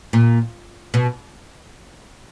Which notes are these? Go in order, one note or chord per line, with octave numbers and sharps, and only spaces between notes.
A#2
B2